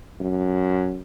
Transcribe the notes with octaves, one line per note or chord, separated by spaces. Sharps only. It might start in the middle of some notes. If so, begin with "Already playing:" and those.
F#2